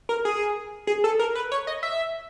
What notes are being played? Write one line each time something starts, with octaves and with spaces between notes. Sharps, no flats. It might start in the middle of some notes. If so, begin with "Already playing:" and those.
A#4
G#4
G#4
A4
A#4
B4
C#5
D#5
E5